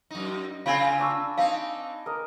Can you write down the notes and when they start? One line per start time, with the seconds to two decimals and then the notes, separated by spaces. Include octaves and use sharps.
0.11 F#2 D#4
0.66 C#3 C4 F4 F5 G#5 B5
0.81 F5
0.99 D4 C#6 E6
1.38 C4 D#4 F5
2.06 A#4 D#5